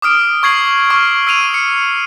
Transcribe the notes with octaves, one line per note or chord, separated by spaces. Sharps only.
D6 D#6 F6 D7
C#6 G#6 C7 F#7
C#6 D6 F6
E6 C7 D#7 F7
C#7